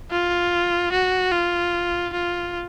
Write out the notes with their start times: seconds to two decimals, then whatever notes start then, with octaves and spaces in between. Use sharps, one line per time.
0.11 F4
0.92 F#4
1.32 F4
2.13 F4